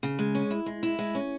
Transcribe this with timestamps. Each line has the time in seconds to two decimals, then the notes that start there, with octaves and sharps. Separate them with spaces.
0.03 C#3
0.19 G#3
0.35 C#4
0.51 E4
0.66 G#3
0.83 E4
0.99 G#3
1.15 C#4